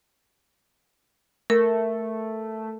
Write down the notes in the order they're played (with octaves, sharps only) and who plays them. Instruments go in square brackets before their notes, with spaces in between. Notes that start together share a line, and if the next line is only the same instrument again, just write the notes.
[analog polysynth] A3 [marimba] A#4